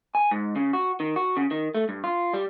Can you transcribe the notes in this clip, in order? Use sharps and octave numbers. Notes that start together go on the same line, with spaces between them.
G#5
G#2
C#3
F#4
D#3
F#4
C#3
D#3
A3
G2
F4
G3